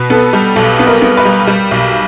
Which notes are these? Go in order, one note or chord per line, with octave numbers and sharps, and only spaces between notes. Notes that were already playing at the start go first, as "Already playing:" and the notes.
Already playing: B2 B3 B4
B3 A4
G3
B1 A4
B3
A#4
B3
B4
G3
G3
B1